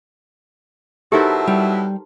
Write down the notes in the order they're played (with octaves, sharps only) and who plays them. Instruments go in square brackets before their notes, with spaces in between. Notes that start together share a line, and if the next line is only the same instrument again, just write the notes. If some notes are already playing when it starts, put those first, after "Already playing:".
[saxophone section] B2 F#3 E4 [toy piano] D#4 G4 [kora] A4 A#4 C5
[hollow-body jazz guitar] G3